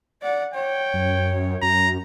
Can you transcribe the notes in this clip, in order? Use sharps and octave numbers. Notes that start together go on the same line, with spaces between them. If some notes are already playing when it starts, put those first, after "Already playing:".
D5 F#5
C#5 G5
F#2
F#2 A#5